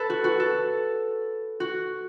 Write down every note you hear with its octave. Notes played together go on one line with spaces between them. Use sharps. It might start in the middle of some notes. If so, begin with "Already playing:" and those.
Already playing: A4 B4
F#4
F#4
A4
F#4